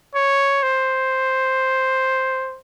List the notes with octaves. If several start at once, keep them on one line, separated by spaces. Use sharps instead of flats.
C#5
C5